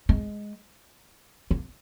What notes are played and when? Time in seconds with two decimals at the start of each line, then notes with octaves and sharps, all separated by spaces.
0.09 G#3
1.51 A#3